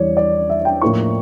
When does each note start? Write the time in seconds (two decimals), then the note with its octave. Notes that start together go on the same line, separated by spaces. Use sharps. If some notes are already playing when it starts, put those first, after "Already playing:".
Already playing: E2 E3 G3 C#5 D5
0.17 D5
0.50 E5
0.65 G5
0.81 A2 F3 A#3 E4 C#6